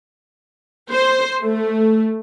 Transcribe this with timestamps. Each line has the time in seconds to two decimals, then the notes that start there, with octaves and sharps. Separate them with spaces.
0.90 C5
1.42 A3